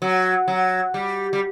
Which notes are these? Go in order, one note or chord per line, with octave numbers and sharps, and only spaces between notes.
F#3
F#3
G3
G3